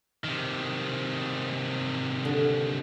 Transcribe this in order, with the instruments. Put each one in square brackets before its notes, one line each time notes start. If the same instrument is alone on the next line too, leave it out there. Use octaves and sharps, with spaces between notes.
[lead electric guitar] C3 D#3
[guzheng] D3